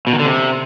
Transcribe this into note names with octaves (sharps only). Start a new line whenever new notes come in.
B2
D#3
D3
C3